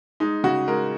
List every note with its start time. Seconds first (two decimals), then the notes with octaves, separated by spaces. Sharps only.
0.20 G#3 D#4
0.44 C#3 F#4
0.68 G#3 A#4